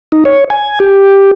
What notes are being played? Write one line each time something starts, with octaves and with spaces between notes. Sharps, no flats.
D#4
C#5
G#5
G4